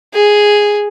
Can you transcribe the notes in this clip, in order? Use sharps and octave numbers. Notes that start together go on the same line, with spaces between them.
G#4